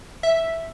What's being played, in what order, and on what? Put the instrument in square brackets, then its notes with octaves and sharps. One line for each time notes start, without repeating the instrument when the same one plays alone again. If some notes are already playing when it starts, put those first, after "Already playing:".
[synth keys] E5